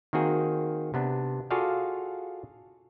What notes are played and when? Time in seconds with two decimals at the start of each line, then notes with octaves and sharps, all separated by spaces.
0.13 D#3 A#3 C4 F#4 G#4
0.94 C3 B3 D4
1.51 F4 F#4 G#4 A4 D5 F5